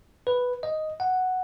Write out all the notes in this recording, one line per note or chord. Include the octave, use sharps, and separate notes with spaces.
B4
D#5
F#5